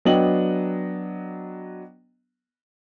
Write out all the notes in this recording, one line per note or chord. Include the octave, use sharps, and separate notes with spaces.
F#3 B3 D4 D#5 G5 F#7